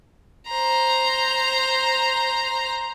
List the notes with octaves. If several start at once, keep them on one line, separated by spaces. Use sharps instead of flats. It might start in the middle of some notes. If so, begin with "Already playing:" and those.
C5 A#5